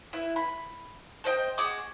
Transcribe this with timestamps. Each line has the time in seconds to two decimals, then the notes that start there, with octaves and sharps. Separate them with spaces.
0.13 E4 B4
0.36 B5
1.24 A4 C5 D#5 G5
1.58 F#4 G#4 D6 D#6